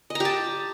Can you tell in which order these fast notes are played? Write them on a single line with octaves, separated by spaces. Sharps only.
D#5 A#5 G4 A5